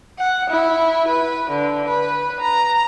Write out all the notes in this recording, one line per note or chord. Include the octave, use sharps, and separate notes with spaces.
F#5
E4
B4
D3
B4
A#5